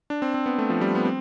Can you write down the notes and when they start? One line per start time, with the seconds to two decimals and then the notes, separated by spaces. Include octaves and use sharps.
0.10 D4
0.22 C4
0.34 C4
0.46 B3
0.58 A3
0.70 F3
0.81 G3
0.95 B3
1.05 C4